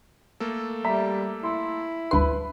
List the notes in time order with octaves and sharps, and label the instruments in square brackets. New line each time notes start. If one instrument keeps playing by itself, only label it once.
[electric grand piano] A3 A#3 A4
[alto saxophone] G3 [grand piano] E5 A#5 B6
[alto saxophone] E4 [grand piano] C6
[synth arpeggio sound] G1 D2 C6 [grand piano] B4 B5